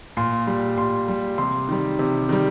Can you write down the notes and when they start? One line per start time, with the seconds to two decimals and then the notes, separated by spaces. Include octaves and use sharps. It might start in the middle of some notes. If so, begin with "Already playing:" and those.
0.17 A#2 C6
0.47 G3
0.77 A#2 C6
1.08 G3
1.38 C3 C6
1.69 D#3 G3
1.99 C3
2.29 D#3 G3